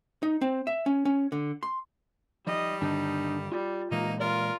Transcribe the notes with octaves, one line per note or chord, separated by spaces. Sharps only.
D#4
C4
E5
C#4
C#4
D3
C6
F3 G3 D#4 D#5
G2 D3 D#3 D4 D#4 A5
G3 F4
A#2 E3 G#3 A#3 D#4
F4 A#4 D5